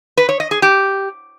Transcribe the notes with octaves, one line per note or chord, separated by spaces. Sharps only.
B4
C#5
D#5
G#4
G4